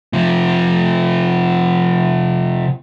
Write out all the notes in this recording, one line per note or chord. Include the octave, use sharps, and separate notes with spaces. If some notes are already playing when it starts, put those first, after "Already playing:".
C3 F3